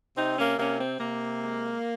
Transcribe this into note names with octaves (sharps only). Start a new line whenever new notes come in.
C3 C4 D#4
A#3 C#4
C3 A#3 C#4
C4
C3 A#3
G#3